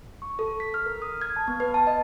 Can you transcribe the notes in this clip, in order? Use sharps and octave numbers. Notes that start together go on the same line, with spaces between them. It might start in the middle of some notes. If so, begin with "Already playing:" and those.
C#6
A4
B6
F6
A#4
D#6
G#6
A5
B3
B4
A5
D#5